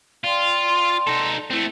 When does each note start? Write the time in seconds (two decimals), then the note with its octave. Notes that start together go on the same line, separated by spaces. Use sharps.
0.24 F4 D5 G5 C6
1.07 D#4 A4
1.51 A3 C4 E4